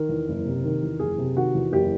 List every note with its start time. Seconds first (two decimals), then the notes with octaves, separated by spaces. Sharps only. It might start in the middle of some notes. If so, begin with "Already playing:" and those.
Already playing: D#3 A#4
0.09 E2
0.28 F#1
0.45 C3
0.64 D#3
0.82 E2
0.99 F#1 G#4
1.18 C3
1.35 D#3 F#4
1.55 E2
1.72 F#1 G4